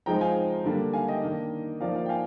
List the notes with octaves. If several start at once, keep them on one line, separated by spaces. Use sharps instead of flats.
F3 G#3 C4 D#4 G5 A#5
F5 G#5
D3 G3 A#3 D4
F5 G#5
D#5 G5
D#3 A#3 D4
F3 A#3 D#4 D5 F5
D5 F5
G5
F5 G#5